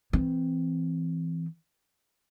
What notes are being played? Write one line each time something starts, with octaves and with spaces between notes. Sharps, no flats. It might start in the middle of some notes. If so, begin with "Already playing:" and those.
E3 C4